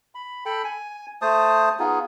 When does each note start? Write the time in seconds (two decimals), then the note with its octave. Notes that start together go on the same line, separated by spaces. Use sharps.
0.15 B5
0.45 A4 G5 B5
0.64 G#5
1.22 A3 C5 A5 D#6
1.79 B3 D#4 F4 G#4